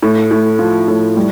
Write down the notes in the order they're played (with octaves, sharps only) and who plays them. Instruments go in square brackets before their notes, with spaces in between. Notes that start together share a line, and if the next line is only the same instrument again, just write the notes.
[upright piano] A2
A2
F3
A2
G3